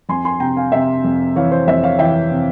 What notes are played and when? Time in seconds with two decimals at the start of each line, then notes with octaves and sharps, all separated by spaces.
0.09 F2 G#5 C6
0.25 G#5 C6
0.40 C3 G5 A#5
0.57 F5 G#5
0.72 C3 E5 G5
1.04 F2
1.36 E3 C#5 F5
1.52 C5
1.67 F2 C5 E5
1.84 C#5 F5
1.99 E3 E5 G5
2.31 C3